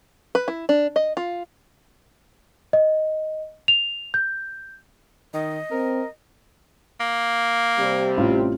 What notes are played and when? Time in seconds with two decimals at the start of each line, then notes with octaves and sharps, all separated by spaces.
0.35 B4
0.48 E4
0.69 D4
0.96 D#5
1.17 F4
2.73 D#5
3.68 F7
4.14 G6
5.34 D#3 D#5
5.71 C4 A#4
7.00 A#3
7.79 C3 G3 C4
8.17 A1 F4